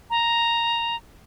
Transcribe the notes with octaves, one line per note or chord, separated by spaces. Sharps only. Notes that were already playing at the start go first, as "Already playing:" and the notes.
A#5